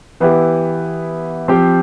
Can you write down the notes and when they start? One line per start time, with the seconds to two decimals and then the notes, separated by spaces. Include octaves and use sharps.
0.20 E3 B3 E4 G4
1.48 F3 C4 G4